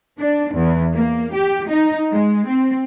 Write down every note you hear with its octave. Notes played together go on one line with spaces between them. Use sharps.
D4
E2
A#3
G4
D#4
G#3
C4